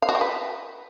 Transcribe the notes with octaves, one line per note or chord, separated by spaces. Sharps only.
F5
F#4
G5
B4